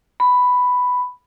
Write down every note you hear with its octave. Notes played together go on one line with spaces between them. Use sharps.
B5